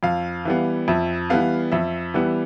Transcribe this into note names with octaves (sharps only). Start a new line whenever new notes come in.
F2 F5
E3 G3 B3
F2 E5
E3 G3 B3 F5
F2 E5
E3 G3 B3